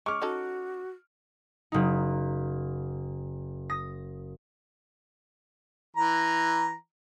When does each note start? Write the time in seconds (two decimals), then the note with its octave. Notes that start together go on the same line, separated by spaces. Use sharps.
0.06 G#3 C#4 C#6 D6 F6
0.22 C#4 D#4 F#4 A4
1.72 F#1 D#4
3.70 D#6 A#6
5.97 E3 A#5